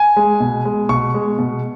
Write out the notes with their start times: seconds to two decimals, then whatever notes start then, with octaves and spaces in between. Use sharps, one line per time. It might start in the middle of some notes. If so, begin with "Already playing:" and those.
Already playing: G#5
0.17 G#3
0.40 B2
0.65 G#3
0.89 B2 C#6
1.14 G#3
1.39 B2